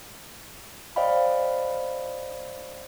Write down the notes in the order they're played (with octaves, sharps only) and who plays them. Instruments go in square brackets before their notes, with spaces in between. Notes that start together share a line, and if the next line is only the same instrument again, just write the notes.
[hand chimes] C5 D5 D#5 F5 G5 B5